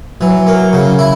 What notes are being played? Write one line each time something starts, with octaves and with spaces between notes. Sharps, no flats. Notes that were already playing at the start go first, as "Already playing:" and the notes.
E3 F#3
A#3
C#3
E4